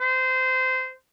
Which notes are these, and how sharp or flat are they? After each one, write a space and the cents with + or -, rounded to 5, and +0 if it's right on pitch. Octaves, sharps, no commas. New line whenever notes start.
C5 -20